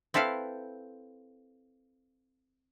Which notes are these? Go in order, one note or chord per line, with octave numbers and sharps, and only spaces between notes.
C4 E4 A4 B4 F5